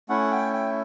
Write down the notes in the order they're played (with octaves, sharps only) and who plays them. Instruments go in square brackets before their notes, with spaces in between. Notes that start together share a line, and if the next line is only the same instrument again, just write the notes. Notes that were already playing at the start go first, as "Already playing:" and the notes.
[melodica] A3 C#4 E4 F#5
G5
G5